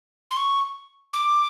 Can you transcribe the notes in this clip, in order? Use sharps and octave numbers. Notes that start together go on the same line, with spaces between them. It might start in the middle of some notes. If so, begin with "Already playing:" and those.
C6
C#6
D6